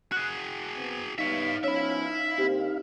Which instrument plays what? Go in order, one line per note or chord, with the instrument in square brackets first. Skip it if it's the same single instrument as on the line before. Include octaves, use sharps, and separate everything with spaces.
[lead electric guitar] F#4 G#4 [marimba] F#6
[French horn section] B3 C4
[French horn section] G3 B3 [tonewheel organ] D#4 F5 [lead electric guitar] C#5 E5
[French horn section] F3 B3 C#4 [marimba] C#5 [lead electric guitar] E5 B5
[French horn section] D3 A#3 C4 [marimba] G4